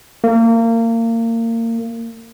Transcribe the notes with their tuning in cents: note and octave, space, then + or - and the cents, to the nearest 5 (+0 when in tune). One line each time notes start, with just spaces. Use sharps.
A#3 -30